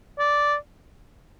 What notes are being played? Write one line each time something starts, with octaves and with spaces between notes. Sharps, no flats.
D5